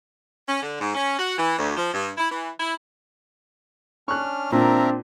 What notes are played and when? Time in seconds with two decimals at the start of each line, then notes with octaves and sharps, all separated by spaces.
0.48 C#4
0.62 D3
0.80 G#2
0.95 C#4
1.19 F#4
1.38 E3
1.58 D2
1.77 F3
1.93 G2
2.18 E4
2.31 E3
2.60 E4
4.08 C#4 D4 C#6 F6 F#6
4.52 A#2 C4 D4 A#4 E5 A#5